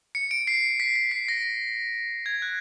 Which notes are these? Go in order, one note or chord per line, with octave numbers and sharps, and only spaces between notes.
C#7
D7
C7
B6
B6
C7
A#6
G#6
F#6